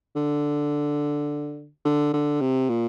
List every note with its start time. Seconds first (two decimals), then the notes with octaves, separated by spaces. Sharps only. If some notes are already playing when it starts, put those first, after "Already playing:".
0.16 D3
1.85 D3
2.14 D3
2.41 C3
2.69 A#2